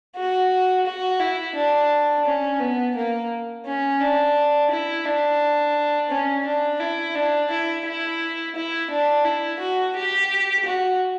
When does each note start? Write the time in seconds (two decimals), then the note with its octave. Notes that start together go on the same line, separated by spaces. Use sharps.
0.16 F#4
0.86 F#4
1.20 E4
1.55 D4
2.26 C#4
2.60 B3
2.95 A#3
3.66 C#4
4.01 D4
4.71 E4
5.05 D4
6.10 C#4
6.46 D4
6.80 E4
7.15 D4
7.51 E4
7.86 E4
8.55 E4
8.90 D4
9.25 E4
9.60 F#4
9.95 G4
10.65 F#4